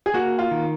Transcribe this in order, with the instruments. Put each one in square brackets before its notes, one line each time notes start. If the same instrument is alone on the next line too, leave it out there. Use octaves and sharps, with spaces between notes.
[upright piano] G#4
[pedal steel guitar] A#3 [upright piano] F#4
[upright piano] F4
[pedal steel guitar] D#3